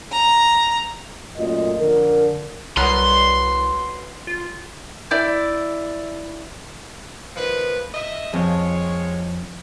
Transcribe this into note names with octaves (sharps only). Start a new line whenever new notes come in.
A#5
F#2 A#2 A3 F4 D#5
F2 D3 A#4
C2 F#3 B3 C6
F4
E4 D5 G6
D#3 F3 B4
D#5 E5
F2 G#3 F4 C#5